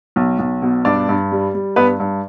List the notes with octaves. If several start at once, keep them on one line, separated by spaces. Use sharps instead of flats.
B1
B1
B2
G2 D4 D5
G2
G3
G3
G2 B3 B4
G2